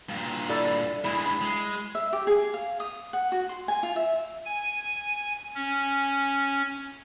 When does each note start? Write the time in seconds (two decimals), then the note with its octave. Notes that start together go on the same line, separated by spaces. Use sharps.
0.09 G2 A#2
0.49 E4 A4 D5
1.04 G2 G#3 E4
1.41 G#3
1.95 E5
2.13 G4
2.27 G#4
2.54 F5
2.80 D#6
3.13 F#5
3.32 F#4
3.49 C6
3.68 G#5
3.83 F4
3.96 E5
4.46 G#5
5.55 C#4